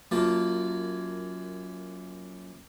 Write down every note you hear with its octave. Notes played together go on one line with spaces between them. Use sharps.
F#2 A#3 F4 A5